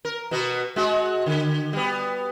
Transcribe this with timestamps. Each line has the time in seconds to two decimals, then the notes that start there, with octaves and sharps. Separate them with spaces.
0.05 A#4
0.31 B2 B3 F#4
0.76 G#3 F#4
1.26 D3
1.73 G3 B3